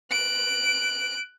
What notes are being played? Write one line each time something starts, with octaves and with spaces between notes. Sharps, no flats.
F#6 D7